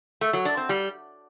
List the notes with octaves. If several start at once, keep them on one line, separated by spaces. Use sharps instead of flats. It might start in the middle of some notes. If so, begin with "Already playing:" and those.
A3
F#3
D4
C4
G3